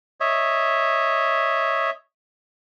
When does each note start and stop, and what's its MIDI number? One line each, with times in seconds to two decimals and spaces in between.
0.20 1.90 73
0.20 1.90 75
0.20 1.90 76